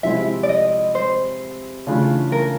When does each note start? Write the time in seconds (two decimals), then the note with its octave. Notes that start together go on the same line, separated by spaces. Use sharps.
0.03 C3 F3 G#3 C4 E4 E5
0.43 D5
0.49 D#5
0.95 C5
1.87 C#3 E3 A3 D4 F4
2.32 A#4